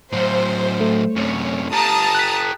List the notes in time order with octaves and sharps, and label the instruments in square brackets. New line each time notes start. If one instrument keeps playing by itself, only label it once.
[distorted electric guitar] A2 F#3 [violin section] C5
[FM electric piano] A3
[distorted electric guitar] F#2 C3 [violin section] C#5
[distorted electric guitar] G4 A4 [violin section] A5 A#5 D#6
[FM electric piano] F#6 B6